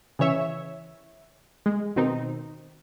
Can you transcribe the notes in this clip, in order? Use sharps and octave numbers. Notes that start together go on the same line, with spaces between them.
C#3 E3 C#5 E5
G#3
B2 D#3 C4 D#4